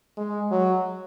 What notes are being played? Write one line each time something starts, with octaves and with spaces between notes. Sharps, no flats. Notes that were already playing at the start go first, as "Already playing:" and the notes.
G#3
F#3